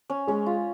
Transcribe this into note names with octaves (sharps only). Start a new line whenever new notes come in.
C#4
G#3 C#4
F4